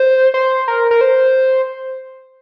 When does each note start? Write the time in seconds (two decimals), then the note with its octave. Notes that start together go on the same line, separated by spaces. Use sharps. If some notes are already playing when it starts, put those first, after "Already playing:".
Already playing: C5
0.34 C5
0.68 A#4
0.91 A#4
1.01 C5